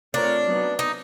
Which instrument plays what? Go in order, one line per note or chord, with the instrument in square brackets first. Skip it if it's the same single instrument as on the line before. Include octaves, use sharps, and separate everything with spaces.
[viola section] A3 C4 F4 A#4 C#5 [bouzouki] D4
[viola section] F#3 B3 D#4
[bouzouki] D#4